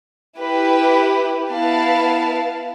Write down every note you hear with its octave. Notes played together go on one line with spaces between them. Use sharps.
E4 G4 B4
B3 E4 B4 F5 A5